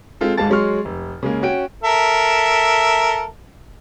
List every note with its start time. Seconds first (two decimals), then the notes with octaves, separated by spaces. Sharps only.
0.21 G#3 C4 F4 A4
0.37 G#1 G#2 G#3 F5 A5 A6
0.50 F#3 G#3 C6 C#6 F6
0.85 F1
1.23 C#3 G#3 A#3
1.43 C#4 F#4 G5 D7
1.84 A4 A#4 E5